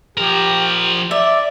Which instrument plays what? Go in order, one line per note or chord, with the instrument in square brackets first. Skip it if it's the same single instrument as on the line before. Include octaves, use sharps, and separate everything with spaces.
[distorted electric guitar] F3 A#4 [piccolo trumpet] G4
[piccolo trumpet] D5 [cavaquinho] E5